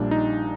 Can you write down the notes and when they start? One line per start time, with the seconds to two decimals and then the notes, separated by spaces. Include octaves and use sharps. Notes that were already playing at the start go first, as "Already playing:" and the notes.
Already playing: A#1 A#2 G3 D4
0.11 D#4